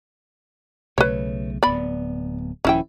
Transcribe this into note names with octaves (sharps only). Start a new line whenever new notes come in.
B1 C#3 A3 B4 C#5
D1 B3 D5 B5
D#1 D#3 F3 C#4 E4 G5